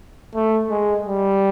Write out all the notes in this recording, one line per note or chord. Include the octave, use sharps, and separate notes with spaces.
A3
G#3
G3